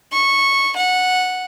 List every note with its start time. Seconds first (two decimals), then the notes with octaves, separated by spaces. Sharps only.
0.13 C#6
0.77 F#5